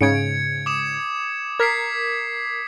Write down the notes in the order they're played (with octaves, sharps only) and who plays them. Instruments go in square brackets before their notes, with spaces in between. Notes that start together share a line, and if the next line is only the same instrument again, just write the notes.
[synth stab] G#2 C#3 D7 [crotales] G#6 C#7
[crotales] D6 D#6 E7
[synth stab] A#4 [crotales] G#6 B6 C7